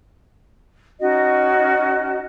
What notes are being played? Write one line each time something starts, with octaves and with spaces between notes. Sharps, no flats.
C#4 D#4 F#4 D#5